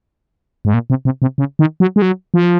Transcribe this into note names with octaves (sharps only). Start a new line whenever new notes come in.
G#2
A#2
C3
C3
C3
C#3
D#3
F#3
G#3
F#3
F3